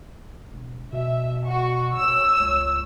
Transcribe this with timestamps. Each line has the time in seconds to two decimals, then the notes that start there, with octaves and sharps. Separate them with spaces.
0.53 E1
0.92 B2 E5
1.46 F#4 C#6
1.95 C#5 E6
2.40 C#2